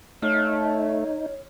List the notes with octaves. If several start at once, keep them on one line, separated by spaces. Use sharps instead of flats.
A3 D#4 C#5 F5